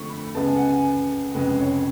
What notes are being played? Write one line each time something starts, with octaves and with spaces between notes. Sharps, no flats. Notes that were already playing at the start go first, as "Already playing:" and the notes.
Already playing: F2 D3 F3 A3 C#6
B5
C#2 C#3 G#3 B3 A5
G#5
F#5
G#5
F1 F2 C#3 G#3 B4
C#5